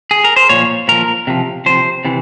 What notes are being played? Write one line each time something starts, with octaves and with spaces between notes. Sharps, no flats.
G#4
A#4
C5
A#2 F3 C#5
A#2 F3 A#4
C3 F3
C3 F3 C5
C3 E3